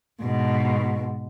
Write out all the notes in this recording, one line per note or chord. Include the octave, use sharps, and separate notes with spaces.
G#2 B2